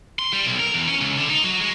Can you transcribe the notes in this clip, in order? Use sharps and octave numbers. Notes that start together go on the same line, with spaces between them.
C6
G3
B1
A#4
E2
C#4
C#2
D3
D#4
F#3
G#3